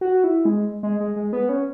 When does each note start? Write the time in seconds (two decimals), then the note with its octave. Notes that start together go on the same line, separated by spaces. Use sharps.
0.01 F#4
0.24 E4
0.45 G#3
0.83 G#3
1.00 G#3
1.16 G#3
1.33 B3
1.49 C#4